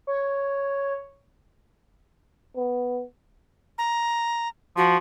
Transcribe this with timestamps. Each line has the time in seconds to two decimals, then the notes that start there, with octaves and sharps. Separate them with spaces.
0.07 C#5
2.56 B3
3.78 A#5
4.77 F3 F#4